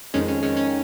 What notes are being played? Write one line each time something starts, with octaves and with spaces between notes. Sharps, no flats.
F2 D#3 G#3 C#4
C#4
F2 D#3 G#3 C#4
C#4